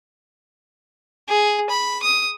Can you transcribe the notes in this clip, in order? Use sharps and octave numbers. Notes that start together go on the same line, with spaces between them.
G#4
B5
D#6